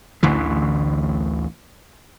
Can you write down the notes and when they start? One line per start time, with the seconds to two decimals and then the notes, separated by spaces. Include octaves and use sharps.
0.23 A1 D2 D3 E3